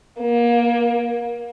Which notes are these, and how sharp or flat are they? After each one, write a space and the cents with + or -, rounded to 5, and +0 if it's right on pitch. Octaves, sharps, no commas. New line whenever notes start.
A#3 +25